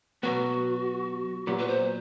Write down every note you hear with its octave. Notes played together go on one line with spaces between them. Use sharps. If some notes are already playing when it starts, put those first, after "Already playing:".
B2 F#3 B3 F#4
A#2 F#3 B3 G4
B4
C5